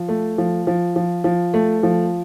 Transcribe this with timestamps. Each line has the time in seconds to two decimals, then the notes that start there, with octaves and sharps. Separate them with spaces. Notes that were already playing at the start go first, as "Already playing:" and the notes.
Already playing: F3
0.09 A3
0.38 F3
0.67 F3
0.96 F3
1.24 F3
1.54 A3
1.83 F3